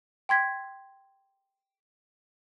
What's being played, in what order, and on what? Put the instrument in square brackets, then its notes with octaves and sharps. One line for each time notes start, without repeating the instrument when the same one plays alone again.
[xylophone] G5 C6 G#6 B6